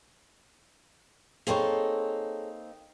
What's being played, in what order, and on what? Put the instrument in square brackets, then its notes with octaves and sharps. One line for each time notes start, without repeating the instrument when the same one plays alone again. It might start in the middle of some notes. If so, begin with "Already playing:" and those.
[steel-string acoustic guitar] A#3 C4 D#4 [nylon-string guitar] G#4 A4 C#5